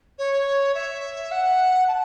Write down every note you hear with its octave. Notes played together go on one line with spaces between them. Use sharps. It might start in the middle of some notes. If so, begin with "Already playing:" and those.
C#5
E5
F#5
A5